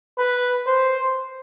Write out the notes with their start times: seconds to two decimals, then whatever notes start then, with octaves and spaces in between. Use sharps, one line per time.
0.19 B4
0.67 C5